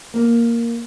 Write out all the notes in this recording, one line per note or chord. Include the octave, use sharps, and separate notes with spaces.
A#3